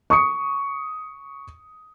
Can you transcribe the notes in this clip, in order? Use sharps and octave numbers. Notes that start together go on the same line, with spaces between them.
C#6 D#6 C#7